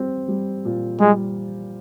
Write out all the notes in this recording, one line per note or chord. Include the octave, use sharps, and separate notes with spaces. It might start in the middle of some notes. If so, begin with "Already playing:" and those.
Already playing: G3 C4
G3
A#2
G3 G#3